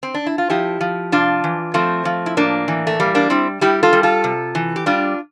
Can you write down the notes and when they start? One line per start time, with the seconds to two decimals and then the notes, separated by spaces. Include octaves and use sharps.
0.03 C4
0.14 D4
0.27 E4
0.38 F4
0.50 F3 E4 G4
0.81 F3
1.12 C3 D4 F4
1.44 E3
1.74 F3 A3 C4
2.05 F3
2.26 E4
2.37 A2 A#3 D4
2.68 E3
2.87 A3
3.00 G3 A#3
3.15 A#3 D4
3.30 G3 C4 E4
3.61 G3 E4 G4
3.83 F4 A4
3.93 G3
4.03 F4 A4
4.24 C3
4.55 E3
4.76 G4
4.86 G3 D4 F4